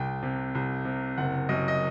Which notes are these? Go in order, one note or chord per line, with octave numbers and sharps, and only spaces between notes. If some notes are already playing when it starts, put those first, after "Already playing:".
Already playing: C2 G5
C3
C2
C3
F#1 F#5
F#2 D#5
D#5